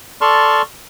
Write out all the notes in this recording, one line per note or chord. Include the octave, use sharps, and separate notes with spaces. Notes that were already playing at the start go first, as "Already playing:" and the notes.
A4 D5 A5 C6 C#6 F6